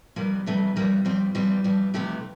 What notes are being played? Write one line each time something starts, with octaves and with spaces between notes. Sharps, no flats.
F2 C3 E3 G3 A#3
F2 C3 E3 G3 A3
F2 E3 G3 A#3
F2 E3 G3 C4
F2 E3 G3 C4
F2 E3 G3
F2 C3 E3 A3 G4